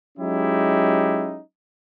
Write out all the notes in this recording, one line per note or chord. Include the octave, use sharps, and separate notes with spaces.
F#3 G#3 C#4 D#4 E4 G4